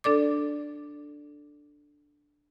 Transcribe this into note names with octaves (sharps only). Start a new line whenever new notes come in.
D4 A4 D5 D6